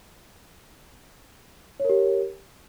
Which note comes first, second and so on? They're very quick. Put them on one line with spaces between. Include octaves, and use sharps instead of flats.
C#5 A#4 G4